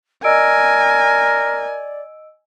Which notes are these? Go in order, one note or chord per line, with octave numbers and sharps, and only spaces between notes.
A#4 D5 D#5 G#5 E6 D7